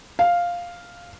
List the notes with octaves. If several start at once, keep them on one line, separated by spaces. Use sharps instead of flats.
F5